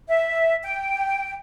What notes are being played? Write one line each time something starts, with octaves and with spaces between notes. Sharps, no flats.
E5
G5